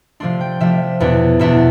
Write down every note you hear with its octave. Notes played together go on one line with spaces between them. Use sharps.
C3 F3 A3 D4 C6
G5
C3 F3 A3 D4 E5
E2 B2 B3 D4
E2 B2 B3 D4 E5